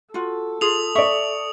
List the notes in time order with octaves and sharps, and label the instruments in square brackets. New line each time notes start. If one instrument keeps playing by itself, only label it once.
[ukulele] F4 F#4 [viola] A4
[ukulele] F4 G#4 [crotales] D#6 F7
[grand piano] D5 C#6 [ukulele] E5